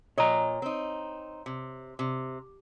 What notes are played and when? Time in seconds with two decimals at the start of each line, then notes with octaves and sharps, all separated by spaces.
0.18 A#2 C#5 D#5 A#5
0.62 C4 D#4
1.46 C3
1.99 C3